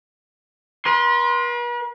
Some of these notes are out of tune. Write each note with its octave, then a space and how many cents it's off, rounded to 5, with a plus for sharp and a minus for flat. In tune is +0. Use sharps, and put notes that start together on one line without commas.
B4 -45 C6 +0